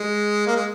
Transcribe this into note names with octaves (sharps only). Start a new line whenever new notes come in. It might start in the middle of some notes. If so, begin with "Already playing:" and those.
Already playing: G#3
A#3
G#3